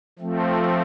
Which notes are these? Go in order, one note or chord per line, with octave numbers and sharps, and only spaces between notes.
F3 A3 C4